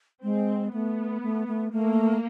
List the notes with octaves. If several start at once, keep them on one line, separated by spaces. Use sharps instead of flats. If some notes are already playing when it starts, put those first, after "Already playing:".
G#3 C4
A3 B3
A3
A3
A3 A#3